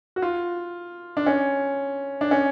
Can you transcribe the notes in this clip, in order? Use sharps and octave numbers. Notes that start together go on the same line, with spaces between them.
F#4
F4
D4
C#4
D4
C#4